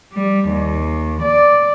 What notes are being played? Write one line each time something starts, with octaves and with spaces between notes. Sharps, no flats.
G3
D#2
D5